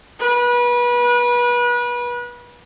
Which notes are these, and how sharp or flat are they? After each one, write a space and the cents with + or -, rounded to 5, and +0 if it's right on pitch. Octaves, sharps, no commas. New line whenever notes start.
B4 -30